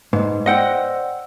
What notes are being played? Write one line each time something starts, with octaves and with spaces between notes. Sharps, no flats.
G#2 B4 D#5
C5 D5 D#5 F#5 G5 E6